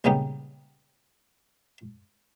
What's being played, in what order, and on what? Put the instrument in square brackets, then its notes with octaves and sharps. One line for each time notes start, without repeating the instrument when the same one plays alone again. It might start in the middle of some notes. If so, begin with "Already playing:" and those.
[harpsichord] C2 A#2 C#3 B3 D#4 G4